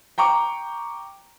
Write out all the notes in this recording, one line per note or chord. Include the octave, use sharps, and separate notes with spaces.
G5 A#5 C#6 D6